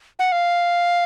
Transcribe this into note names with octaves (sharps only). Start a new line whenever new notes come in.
F#5
F5